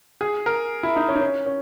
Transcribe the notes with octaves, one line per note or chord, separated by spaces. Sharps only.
G#4
A#4
E4
D#4
C#4
D#4
C#4
C#4